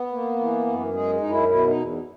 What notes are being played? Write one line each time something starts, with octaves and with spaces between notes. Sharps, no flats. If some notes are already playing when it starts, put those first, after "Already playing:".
Already playing: B3
A#3
E3
F#2
G#3 G#4
F#2 D#4
E4
B2 E4
D#4
E2